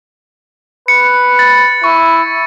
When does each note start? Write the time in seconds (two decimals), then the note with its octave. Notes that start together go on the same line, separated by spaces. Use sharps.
0.88 B4 C#7
1.39 A6
1.84 E4 C#6